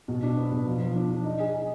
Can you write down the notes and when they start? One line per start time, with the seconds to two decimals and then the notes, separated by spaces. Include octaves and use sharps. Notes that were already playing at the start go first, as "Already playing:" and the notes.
0.08 B2
0.23 D4
0.37 B3
0.52 B2
0.66 F3
0.81 F3
0.95 D4
1.10 D4
1.25 D#4
1.40 G#4
1.53 D#4